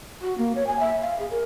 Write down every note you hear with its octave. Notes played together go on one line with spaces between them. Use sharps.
F#4
A#3
C#5
G#5
E5
F5
G#4
A#4